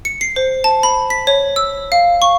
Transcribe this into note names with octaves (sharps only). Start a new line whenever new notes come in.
C#7
C7
C5
A5
B5
B6
C#5
E6
F5
C#6